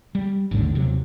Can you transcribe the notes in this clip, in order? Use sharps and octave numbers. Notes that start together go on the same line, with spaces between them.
G3
G#1 D#2 A2 D3
D#1 C3 F#3